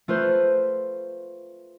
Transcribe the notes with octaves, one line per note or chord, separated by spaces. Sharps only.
A3 F4 B4 C5